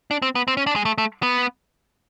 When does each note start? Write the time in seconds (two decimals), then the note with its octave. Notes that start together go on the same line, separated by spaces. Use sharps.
0.11 D4
0.22 C4
0.35 B3
0.48 C4
0.57 C#4
0.67 D4
0.76 G#3
0.85 A3
0.98 A3
1.23 B3